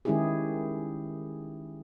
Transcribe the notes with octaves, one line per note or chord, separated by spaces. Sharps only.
D#3 G#3 C#4 E4 G4 G#4